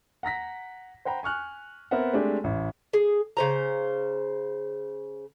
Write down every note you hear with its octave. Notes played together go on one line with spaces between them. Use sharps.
F#5 A#5 A#6 B6
C5 F#5 G5 A#5 B5
G#5 C#6 F6 F#6
B3 C4 A#4 E5 F#5
G#3 A3 C4 D4 G4
A1 E4
G#4
C#3 C5 A#5